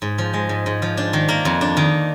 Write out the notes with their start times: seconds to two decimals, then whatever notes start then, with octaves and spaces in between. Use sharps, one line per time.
0.02 G#2
0.18 F3
0.34 G#3
0.49 G#2
0.66 G#2
0.82 F3
0.97 D4
1.13 D#3
1.29 A#3
1.45 F2
1.61 D4
1.77 D#3